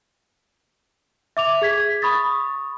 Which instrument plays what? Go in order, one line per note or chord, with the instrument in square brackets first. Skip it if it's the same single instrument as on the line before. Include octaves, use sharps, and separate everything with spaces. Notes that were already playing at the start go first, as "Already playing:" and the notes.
[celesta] E5 D6 F7
G#4 G#6 B6
B5 C#6 D#6 A6